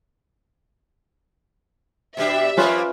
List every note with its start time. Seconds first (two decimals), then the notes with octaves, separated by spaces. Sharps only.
2.17 B2 G3 D4 E5
2.57 F3 G3 A#3 C#4 F4 B4